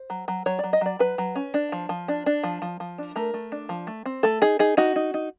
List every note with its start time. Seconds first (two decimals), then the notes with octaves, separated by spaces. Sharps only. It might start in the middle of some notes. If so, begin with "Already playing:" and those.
Already playing: C5
0.10 F#3
0.28 F#3
0.46 F#3 C#5
0.59 F#3 D5
0.73 D#5
0.81 F#3 D5
0.99 F#3 B4
1.18 F#3
1.35 C#4
1.54 D4
1.72 F3
1.89 F3
2.08 D4
2.26 D4
2.43 F3
2.62 F3
2.80 F3
2.98 D4
3.16 A3 A#4
3.34 A3
3.52 D4
3.69 F3
3.87 A3
4.06 C4
4.23 A3 A4
4.42 D#4 G#4
4.59 D#4 G#4
4.77 D#4 F#4
4.96 D#4
5.14 D#4